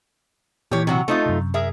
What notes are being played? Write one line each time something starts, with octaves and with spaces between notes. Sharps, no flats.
A#2 E3 G4 C#5
C3 F#3 F#4
A3 C4 D#4 F4
F#2 C3
G#4 A#4 E5